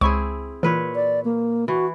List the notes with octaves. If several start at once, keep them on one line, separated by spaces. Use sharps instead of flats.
C#2 C4 E4 G#4 C#6
A#2 E3 B4 C#5
D5
A#3
E3 F#4